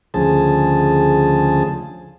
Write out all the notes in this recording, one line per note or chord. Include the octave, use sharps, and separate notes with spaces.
D2 C#3 F3 G#4 A5